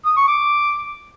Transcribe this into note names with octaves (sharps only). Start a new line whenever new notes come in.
D#6
C#6
D6